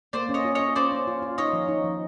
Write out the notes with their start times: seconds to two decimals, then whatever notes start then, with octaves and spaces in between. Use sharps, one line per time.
0.13 A#3 C5 D5
0.29 C#4
0.34 C#5 D#5
0.45 F4
0.55 C#4 C#5 D#5
0.76 C#4 C5 D5
0.92 C#4
1.08 F4
1.22 F4
1.38 D#4 C#5 D#5
1.53 F3
1.69 D#4
1.84 F3